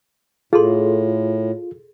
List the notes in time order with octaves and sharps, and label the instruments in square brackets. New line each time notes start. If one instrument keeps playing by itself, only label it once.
[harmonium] A2 [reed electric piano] F4 [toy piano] G#4 A4 C6